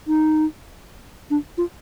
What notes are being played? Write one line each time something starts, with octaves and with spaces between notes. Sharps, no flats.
D#4
D4
F4